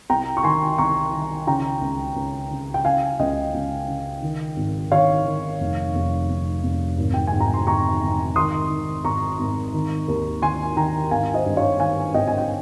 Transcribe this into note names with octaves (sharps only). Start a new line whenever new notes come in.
C2 G5 A#5
C#6
D#3 G#5 C6
C2 A#5 C#6
D#3
C#3 G5 A#5
C#2
C#2
C#3
G5
C#3 F5 G#5
C#2 D#5 G5
C#2
C#3
D#3
G#1
D#3 C#5 F5
D#3
F1
F1
F1
F1
G#1
G5
G#5
G#2
A#5
C6
G#1 A#5 C#6
G#1
D#3 C6 D#6
D#3
G#1 A#5 C#6
G#1
D#3
D#2
D#3 G#5 C6
D#3 G5 A#5
G#1 F5 G#5
C5 D#5
G2
C#5 F5
D#3 F5 G#5
G#1 D#5 G5
G#5
G5